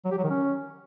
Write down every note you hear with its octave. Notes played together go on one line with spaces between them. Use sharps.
F#3
G4
F#3
D#3
C#4